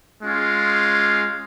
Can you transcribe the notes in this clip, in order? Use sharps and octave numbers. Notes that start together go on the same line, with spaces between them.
G#3 C#4 F4